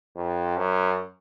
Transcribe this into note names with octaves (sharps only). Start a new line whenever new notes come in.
F2
F#2